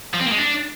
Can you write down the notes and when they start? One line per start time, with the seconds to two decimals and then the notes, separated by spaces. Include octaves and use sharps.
0.14 F3
0.20 C4
0.26 A#3
0.32 G#3
0.38 D4